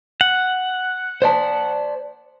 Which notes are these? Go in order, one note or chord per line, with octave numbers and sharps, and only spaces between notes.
F#5
C5 D5 A5